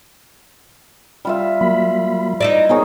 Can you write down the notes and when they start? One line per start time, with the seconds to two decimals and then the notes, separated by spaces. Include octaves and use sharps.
1.25 G3 F4 E5
1.61 F#3 A#3 B5
2.40 D#4 E4 D5 A#5
2.69 D#3 B3 G#4 C#5